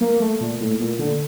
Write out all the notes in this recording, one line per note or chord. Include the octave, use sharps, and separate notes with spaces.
A#3
A3
A#2
A2
A#2
D3